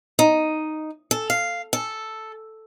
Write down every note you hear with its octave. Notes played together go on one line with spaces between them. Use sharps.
D#4
A4
F5
A4